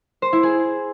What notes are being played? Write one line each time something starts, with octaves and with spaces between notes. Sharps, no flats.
C5
E4
G#4